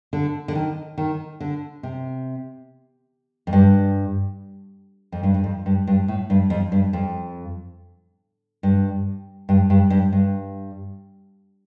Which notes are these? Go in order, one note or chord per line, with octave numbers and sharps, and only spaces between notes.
D3
D3
D#3
D#3
D3
C3
F2
G2
F2
G2
G2
F2
G2
G2
A2
G2
F2
G2
F2
G2
G2
G2
G2
G2